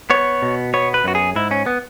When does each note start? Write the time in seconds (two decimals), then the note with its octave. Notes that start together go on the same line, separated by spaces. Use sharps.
0.10 B3 C#5
0.42 B2
0.74 B3 C#5
0.94 B4
1.04 F#2 F#4
1.15 G#4
1.36 G#2 E4
1.51 C#4
1.66 B3